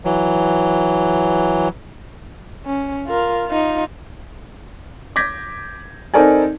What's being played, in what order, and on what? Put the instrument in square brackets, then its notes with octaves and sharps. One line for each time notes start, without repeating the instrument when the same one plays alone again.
[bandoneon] E3 F#3
[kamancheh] C#4
F4 A#4
D#4 F4
[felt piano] D6 G6 G#6 A#6 B6
C4 D#4 A4 A#4 D5 G#5